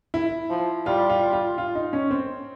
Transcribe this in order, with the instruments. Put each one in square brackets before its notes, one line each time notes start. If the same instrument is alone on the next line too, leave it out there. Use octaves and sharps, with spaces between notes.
[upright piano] E4
[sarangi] F3
[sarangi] G3 [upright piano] F4
[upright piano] F4
F4
F4
D#4
C#4
C4